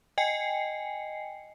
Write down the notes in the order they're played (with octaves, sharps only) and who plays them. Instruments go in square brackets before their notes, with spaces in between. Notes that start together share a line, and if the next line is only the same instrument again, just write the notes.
[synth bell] D#5 G5 G#5 C7 C#7